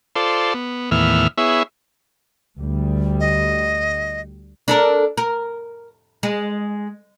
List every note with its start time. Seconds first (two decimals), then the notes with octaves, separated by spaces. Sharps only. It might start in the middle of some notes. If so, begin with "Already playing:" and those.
0.16 F4 A4 C5 D5
0.54 B3
0.91 D#2 A2 E3 B3 E5 F6
1.38 B3 E4 G#4 C#5 E5
2.60 D2 G3
3.20 D#5
4.68 D4 A4 A#4
5.17 A#4
6.23 G#3